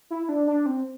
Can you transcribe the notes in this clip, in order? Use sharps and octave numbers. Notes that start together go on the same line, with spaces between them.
E4
D4
D4
C4